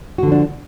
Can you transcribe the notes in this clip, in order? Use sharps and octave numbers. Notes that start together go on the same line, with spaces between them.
D3 F3 D4 F#4